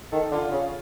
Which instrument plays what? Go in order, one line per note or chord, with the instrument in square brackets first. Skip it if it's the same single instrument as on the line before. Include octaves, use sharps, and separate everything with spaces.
[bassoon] D#3 [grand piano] A4
[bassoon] D3 [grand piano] F4
[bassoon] C#3